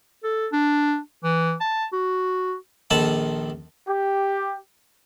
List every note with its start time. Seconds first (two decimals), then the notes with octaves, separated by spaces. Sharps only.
0.24 A4
0.52 D4
1.24 E3
1.61 A5
1.93 F#4
2.90 A#1 D#3 A4 A5 B5
3.88 G4